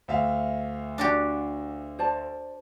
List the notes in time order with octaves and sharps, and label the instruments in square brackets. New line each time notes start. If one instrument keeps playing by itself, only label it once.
[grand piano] D2 E5 F5
[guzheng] D4 F#4 G4
[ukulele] C5 D5 A5